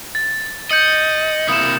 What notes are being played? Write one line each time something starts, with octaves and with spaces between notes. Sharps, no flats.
A6
D#5 G6 C#7 F#7
C3 A#3 E4 D#6 E7